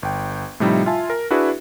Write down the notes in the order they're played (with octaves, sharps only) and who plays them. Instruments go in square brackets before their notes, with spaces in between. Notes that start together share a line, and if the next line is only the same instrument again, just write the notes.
[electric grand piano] G1 G5
A2 C3 F3 G3 D#4 E4
F4 E5 G#5 A5
A#4
D4 E4 F#4 G#4 B4 E5